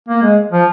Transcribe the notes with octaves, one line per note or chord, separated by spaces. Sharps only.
A#3
G#3
F3